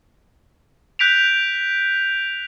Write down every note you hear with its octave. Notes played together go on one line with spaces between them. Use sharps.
F#6 G6 B6 D7 F7